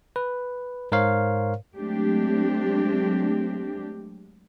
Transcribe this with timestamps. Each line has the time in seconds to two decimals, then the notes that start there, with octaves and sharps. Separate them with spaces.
0.16 B4
0.92 G#2 A#4 C5 C#5 F5
1.78 F#3 G#3 A3 C4 D4 G4